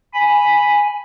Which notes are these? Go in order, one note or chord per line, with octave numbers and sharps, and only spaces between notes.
G#5 B5